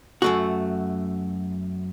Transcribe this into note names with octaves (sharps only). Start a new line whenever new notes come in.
F#2 A3 F#4